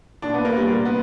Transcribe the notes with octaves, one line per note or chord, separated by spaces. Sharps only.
A#2 D4
B3
A#3
G3
A#2 A#3
B3